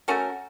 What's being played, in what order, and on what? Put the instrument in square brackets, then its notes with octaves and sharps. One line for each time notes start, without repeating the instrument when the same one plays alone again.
[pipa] A3 C#4 F#4 A#4